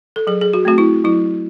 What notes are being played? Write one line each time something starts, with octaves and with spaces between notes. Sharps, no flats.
A4
F#3 G#4
G#4
F#4
A3 C4 F#4
E4
F#3 E4